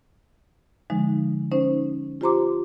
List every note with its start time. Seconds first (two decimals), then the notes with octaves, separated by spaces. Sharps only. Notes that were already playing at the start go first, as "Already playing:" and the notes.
0.90 D3 F3 G#3 D#4
1.52 C#4 D#4 C5
2.21 F4 G4 C5 A#5 C6 D6